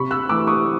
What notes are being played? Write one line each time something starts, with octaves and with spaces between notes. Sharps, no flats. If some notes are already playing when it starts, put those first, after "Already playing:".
Already playing: C3 B5 C#6
E6 F#6
E3 A3 D6 E6
C#6 D#6